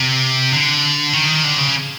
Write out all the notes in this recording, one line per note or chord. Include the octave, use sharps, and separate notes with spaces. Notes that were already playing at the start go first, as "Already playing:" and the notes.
Already playing: C3
D3
D#3
D3
C#3